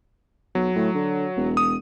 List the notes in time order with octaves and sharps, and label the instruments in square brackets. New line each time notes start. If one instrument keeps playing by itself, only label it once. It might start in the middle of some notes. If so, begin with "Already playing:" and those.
[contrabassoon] B1 [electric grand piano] F#3
[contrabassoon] A2
D3
E1
[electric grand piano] D#6